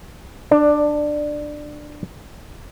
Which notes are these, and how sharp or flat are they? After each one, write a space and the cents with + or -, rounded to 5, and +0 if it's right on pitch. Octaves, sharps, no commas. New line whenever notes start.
D4 +15 D5 +0